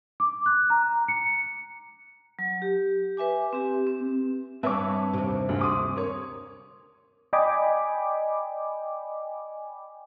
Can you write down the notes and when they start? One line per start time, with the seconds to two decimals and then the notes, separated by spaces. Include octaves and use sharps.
0.20 D6
0.46 F#6
0.70 A#5
1.08 C#7
2.39 F#3
2.62 G4
3.17 B4 E5 G#5 D6
3.53 C4 G4
3.87 C4
4.63 G2 C4 B4 C#5 E5 A5 D6
5.14 D#2 C3
5.49 D2 D3
5.61 C6 D6 D#6 D#7
5.96 A#4 C#5
7.33 D5 D#5 G5 G#5 B5 D6